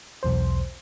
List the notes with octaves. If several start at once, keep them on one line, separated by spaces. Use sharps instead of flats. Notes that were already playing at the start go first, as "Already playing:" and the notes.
B1 E2 C5